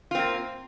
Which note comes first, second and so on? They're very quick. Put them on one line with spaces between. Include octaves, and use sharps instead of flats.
F4 C4 A#3